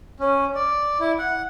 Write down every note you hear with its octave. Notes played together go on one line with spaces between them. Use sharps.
C#4
D5
E4
F#5